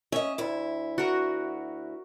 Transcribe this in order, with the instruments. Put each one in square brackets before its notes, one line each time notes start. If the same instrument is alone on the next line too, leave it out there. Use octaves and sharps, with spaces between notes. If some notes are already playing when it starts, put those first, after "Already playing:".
[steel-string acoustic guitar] C#4 D#5 [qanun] E5
[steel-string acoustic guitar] D2 E4
[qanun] F#4 A#4